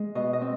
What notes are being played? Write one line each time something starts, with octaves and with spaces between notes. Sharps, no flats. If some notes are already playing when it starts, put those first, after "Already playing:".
Already playing: G#3
B2 D#5
D#5
C4